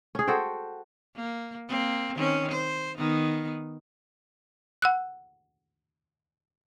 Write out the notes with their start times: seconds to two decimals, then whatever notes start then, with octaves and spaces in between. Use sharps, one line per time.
0.15 C#4 G#4
0.27 F#4 A4 C5 G5
1.16 A#3
1.69 A#3 C4
2.15 D#3 C4 C#4
2.51 C5
2.98 D#3 B3 D#4
4.82 F#5 E6 F#6